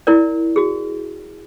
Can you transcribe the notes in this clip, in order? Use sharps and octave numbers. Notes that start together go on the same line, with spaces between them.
E4 A#4 D5
F#4 G#4